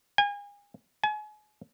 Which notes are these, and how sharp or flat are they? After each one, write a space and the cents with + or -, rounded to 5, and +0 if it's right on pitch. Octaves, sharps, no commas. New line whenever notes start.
G#5 -35
G#5 +35